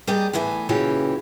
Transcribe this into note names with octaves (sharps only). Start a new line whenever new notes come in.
G3 A#3 G4 G#4 D5 D#5
A2 E3 B3 G#5
A#2 C#3 E3 C#4 F#4 G4